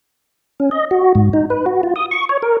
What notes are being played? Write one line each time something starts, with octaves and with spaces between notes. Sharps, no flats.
C#4
D#5
F#4
G#2
D#4
B4
F#4
F4
D#6
C#6
C#5
A#4